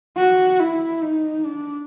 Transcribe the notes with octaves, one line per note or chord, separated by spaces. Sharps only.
F#4
E4
D#4
D4